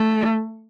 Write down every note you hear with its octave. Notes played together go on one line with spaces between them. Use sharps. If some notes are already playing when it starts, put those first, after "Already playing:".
Already playing: A3